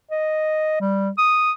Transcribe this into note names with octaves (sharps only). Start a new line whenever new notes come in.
D#5
G3
D#6